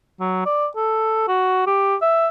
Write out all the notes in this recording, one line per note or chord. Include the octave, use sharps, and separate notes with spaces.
F#3
D5
A4
F#4
G4
E5